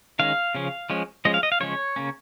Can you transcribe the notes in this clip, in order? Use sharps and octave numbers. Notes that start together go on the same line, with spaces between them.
D#3 G#3 C#4 F5
C#3 F3 C#4
F3 G#3 C#4
F3 G#3 C#4 D#5
F5
D#5
F5
C#3 F3 G#3 C#4 C#5
C#3 A#3 C#4